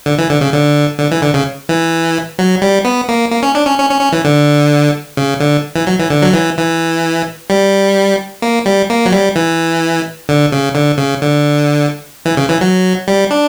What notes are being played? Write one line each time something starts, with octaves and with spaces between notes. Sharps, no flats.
D3
E3
D3
C#3
D3
D3
E3
D3
C#3
E3
F#3
G3
B3
A#3
A#3
C#4
D4
C#4
C#4
C#4
C#4
E3
D3
C#3
D3
E3
F#3
E3
D3
F#3
E3
E3
G3
A#3
G3
A#3
F#3
G3
E3
D3
C#3
D3
C#3
D3
E3
C#3
E3
F#3
G3
D4